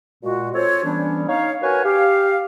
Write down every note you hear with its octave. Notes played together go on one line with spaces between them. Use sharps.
A#2 G#3 F#4
C4 F4 A4 C5 C#5
D3 E3 G3 B3 C#4 D4
D#4 C#5 F5
F#4 A#4 B4 C#5 G#5
G4 F5